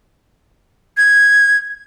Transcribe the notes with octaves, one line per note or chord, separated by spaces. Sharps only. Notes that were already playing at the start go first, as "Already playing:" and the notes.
G#6